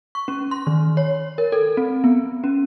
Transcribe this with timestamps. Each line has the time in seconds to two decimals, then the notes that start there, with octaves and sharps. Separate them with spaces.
0.15 C#6
0.28 C#4
0.51 C6
0.67 D#3
0.97 C#5
1.38 A#4
1.52 A4
1.77 C4
2.04 B3
2.44 C#4